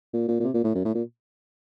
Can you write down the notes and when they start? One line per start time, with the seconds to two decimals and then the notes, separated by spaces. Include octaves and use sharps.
0.13 A#2
0.28 A#2
0.40 A#2
0.43 C3
0.54 A#2
0.64 A2
0.75 F#2
0.85 A2
0.95 A#2